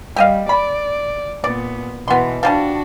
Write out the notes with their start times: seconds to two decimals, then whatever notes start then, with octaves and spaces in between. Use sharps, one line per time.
0.16 G3 G4 D#5 F5
0.49 D5 B5
1.44 A#2 B3 D5
2.08 B2 E3 B3 C6
2.43 F3 G3 D4 F#4 A5